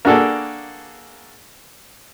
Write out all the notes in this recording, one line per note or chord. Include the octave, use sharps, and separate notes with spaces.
A#3 D4 F#4 G#4 A4